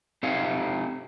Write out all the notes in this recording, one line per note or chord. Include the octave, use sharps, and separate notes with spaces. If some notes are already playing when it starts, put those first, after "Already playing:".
C4 D#4 G4 F5